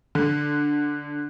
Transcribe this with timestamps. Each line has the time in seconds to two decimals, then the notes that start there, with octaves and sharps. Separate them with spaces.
0.15 D3